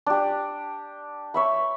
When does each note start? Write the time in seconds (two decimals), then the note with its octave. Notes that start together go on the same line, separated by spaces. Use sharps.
0.06 D4 G4
1.34 C#5 E5 B5